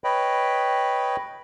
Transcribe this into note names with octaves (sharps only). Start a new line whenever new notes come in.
B4 C#5 D#5 G5 B5